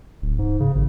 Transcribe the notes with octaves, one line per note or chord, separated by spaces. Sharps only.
D1
G#2
C#3
G#1